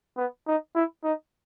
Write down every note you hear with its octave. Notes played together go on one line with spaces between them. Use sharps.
B3
D#4
E4
D#4